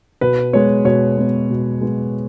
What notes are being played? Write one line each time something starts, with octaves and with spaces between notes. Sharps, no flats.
B2 B4
G#3 B3 C#5
B2 C#5
G#3 B3
B2
G#3 B3